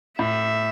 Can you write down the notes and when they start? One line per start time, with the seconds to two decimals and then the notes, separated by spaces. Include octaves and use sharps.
0.19 A2 E5